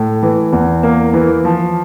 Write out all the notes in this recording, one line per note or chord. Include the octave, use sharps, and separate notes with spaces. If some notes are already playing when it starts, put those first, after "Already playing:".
Already playing: A2
E3
E2
A#3
E3
F3